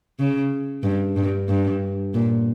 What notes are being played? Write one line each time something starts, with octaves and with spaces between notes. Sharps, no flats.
C#3
G2
G2
G2
A#2